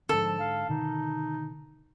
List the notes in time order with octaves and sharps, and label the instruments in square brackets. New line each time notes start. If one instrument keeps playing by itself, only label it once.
[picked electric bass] G#2 D3 [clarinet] F3 [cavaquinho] A4
[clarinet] F5
[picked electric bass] B2 D3 D#3 [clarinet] D#4